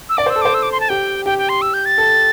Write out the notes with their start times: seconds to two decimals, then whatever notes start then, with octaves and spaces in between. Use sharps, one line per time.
0.09 E6
0.17 D5 D6
0.26 C5
0.30 E6
0.36 A4
0.42 C5 D6
0.54 E6
0.63 D6
0.72 C6
0.80 A5
0.89 G4 G5
1.25 G4 G5
1.38 G5
1.49 C6
1.62 E6
1.74 G6
1.86 A6
1.98 A4